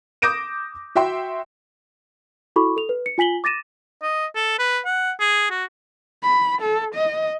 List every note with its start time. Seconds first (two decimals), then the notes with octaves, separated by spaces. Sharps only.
0.22 D6 D#6 G6 A#6 D7 E7
0.95 F#4 E5 G5 C6
2.56 E4 F#4 A4 B5 C#6 D6
2.77 A4 F7
2.89 B4
3.06 C#7
3.18 F4 G#5 B6 F#7 G7
3.44 D6 A6 A#6 D#7 E7
4.02 D#5
4.36 A4
4.59 B4
4.85 F#5
5.20 G#4
5.50 F#4
6.23 B5
6.61 A4
6.95 D#5